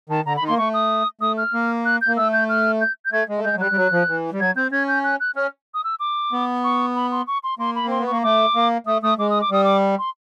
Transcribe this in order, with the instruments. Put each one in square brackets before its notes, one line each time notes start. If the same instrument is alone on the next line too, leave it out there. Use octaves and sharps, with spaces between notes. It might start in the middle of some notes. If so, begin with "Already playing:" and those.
[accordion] D#3 [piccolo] A5
[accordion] D3 [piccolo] A#5
[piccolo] B5
[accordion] D#3
[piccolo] C6
[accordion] A#3
[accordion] A3 [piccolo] C#6
[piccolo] D#6
[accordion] A3 [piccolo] D#6
[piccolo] F6
[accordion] A#3
[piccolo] F#6
G6
[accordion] A#3
[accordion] A3 [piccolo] E6
[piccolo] G6
F6
G6
G6
[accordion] A3 [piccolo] G#6
[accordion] G#3
A3
[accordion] G#3 [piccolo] G6
[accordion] F#3
[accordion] G3 [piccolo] F#6
[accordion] G3
F#3
F3
E3
G3
[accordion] F#3 [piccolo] G#6
[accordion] C4 [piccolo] G6
[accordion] C#4 [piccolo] G#6
[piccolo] G6
F#6
F#6
[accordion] C#4 [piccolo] F6
[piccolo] D#6
E6
D6
[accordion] B3
[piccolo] C#6
B5
C6
C#6
C6
[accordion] A#3 [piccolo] C6
[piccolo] B5
[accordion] C4 [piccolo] C6
[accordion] B3
[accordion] A#3 [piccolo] C#6
[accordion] A3 [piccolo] D6
[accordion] A#3
[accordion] A3 [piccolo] D#6
[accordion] A3 [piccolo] D#6
[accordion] G#3 [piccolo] D6
[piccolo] D#6
D6
[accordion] G3 [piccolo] D#6
[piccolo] D6
C6